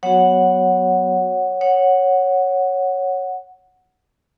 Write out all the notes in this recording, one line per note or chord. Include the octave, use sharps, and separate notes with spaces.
F#3 B3 F#4 C#5 F#5
C#5 F#5